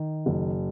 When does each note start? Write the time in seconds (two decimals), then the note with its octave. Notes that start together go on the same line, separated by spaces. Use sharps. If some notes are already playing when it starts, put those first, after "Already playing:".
Already playing: D#3
0.26 F#1